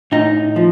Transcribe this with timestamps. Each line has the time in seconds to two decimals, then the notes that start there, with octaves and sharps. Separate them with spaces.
0.12 A2 D#4
0.56 F3